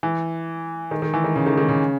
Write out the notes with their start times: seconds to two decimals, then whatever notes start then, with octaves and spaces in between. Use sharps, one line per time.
0.03 E3
0.91 D#3
1.02 D#3
1.14 E3
1.24 D#3
1.36 C#3
1.46 D#3
1.58 D#3
1.69 C#3